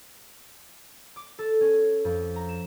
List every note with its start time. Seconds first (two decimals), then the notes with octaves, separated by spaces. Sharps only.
1.16 D6
1.39 A4
1.61 C#4
2.05 F2
2.36 A#5
2.49 E7